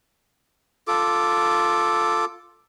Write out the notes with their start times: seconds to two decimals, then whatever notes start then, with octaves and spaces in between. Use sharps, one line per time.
0.88 F4 A4 D6